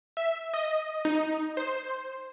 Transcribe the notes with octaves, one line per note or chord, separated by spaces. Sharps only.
E5
D#5
D#4
C5